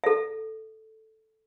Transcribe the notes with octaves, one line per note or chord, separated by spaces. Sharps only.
A4 E5